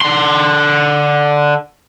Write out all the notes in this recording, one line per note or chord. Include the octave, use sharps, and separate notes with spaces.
D3 C6